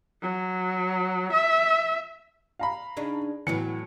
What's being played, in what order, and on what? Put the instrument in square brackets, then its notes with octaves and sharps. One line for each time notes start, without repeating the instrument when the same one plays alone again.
[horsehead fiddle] F#3
E5
[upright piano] F5 A#5 B5
[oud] C#3 D4 D#4
[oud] A2 F#3 B3 [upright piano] E3 C#7